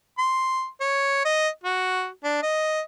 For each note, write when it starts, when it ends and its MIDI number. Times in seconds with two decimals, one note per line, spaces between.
0.18 0.67 84
0.81 1.24 73
1.25 1.48 75
1.64 2.08 66
2.24 2.42 62
2.42 2.81 75